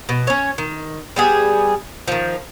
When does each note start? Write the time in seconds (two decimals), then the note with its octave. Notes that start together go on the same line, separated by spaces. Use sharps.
0.09 B2
0.27 C#4 C#5
0.58 D#3
1.16 G3 B3 G#4
2.08 D#3 F3